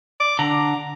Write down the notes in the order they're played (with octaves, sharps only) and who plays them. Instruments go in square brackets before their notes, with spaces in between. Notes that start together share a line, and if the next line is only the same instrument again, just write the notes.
[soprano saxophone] D6
[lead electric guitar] D3 [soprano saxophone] A#5